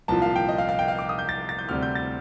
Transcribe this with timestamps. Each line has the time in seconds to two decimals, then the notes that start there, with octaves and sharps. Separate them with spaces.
0.08 C2 A#2 F3 A5
0.22 F5
0.36 G5
0.49 D#5
0.58 F5
0.69 F5
0.79 G5
0.88 F5
0.99 D6
1.09 D#6
1.19 G6
1.29 A6
1.49 A6
1.59 G6
1.69 D2 C3 G3 F6
1.83 G6
1.95 A6